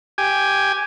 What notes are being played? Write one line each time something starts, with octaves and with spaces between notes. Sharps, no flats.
G4 G#5